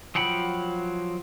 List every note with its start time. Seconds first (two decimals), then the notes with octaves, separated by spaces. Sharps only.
0.15 F3 F#3 F#5 G5 B5